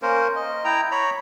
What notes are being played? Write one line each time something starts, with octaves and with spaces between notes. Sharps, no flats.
A#3 C#4 A#4 C5
D#5
E4 G5 A#5
C#5 A#5 B5